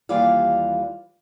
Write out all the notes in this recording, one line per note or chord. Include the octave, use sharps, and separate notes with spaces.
D#2 E3 G3 F4 D5 F5